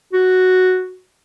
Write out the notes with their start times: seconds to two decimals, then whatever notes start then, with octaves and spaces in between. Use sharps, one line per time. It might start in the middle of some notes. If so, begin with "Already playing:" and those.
0.13 F#4